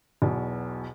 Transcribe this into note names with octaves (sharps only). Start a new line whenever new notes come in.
B1 E2 B2